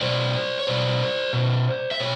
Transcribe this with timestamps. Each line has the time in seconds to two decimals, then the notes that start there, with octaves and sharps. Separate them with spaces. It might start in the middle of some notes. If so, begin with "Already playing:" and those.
0.01 B2 C5 D5
0.59 C#5
0.67 B2 C5 D5
1.33 B2
1.91 E5
2.00 B2 C#5